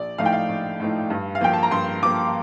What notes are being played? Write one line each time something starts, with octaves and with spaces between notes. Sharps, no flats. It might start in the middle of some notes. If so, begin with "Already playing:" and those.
Already playing: A#1 D5
A2 F3 A3 D#4 F5
G5
F5
A#1
A2 F3 A3 D#4
G2
F5
F3 A#3 G5
A5
A#5
G2 C6
F3 A#3 D6